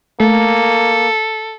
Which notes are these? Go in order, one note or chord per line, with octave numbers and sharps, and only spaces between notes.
A3 A#3 A4